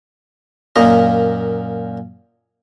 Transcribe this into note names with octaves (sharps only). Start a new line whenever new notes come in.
F#2 A#2 A#3 D#5